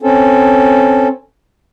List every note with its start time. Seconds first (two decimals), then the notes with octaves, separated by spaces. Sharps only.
0.02 C4 C#4 A4